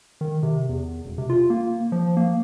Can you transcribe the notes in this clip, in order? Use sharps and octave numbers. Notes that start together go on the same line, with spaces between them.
D#3
C3
E2
E1
C3
F4
A#3
F3
A#3